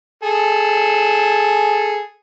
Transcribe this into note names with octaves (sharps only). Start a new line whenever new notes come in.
G#4 A4